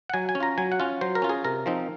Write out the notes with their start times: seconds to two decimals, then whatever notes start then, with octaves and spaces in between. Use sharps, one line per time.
0.10 F#5
0.14 F#3 G#5
0.29 G#5
0.35 C#4
0.40 F4 A#5
0.58 F#3 G#5
0.72 F#5
0.80 C#4 F4
1.01 F#3 C5
1.15 A#4
1.22 C#4 F4
1.29 G#4
1.45 C3 A#4
1.66 F3 C4 D#4